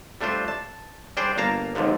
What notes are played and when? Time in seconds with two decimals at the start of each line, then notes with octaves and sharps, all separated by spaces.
0.21 G3 A3 D4 F4 C5
0.48 A5
1.17 G3 D4 G#4 C5 G5
1.37 G1 A#3 F5 A5 A#5
1.75 G#1 D#2 G#2 D3 F3